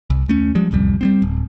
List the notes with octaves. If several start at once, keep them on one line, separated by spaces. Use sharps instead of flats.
C2
D#2 A3 C#4
F3 G3 G#3
D1 C2 F2 G3
G3 B3 C4
D1